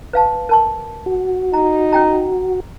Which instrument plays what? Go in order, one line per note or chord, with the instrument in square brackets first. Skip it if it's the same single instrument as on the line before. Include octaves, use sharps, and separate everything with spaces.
[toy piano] B4 F5 A5
A#4 A5 C#6
[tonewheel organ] F#4
[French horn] D#4 [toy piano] A#5
[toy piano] C#4 G5 A#5